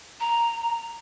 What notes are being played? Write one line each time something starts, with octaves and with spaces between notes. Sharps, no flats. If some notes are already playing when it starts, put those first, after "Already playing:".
A#5